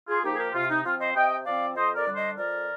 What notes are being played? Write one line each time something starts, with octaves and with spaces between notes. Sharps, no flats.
F4 G#4
F3 A#3 D#4 G4
G#4
G4 A#4
C3 F4
D#4
F3 C4 F4
C5 D#5
C3 D#5 G5
F3 C4 D5 F5
F2 C5 D#5
A#4 D5
D3 G3 D4
C5 D#5
F2 A#4 D5